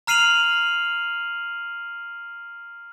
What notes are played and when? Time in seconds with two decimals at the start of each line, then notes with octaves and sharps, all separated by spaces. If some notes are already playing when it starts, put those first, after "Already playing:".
0.07 A#5 F6 C7 D#7 F7 F#7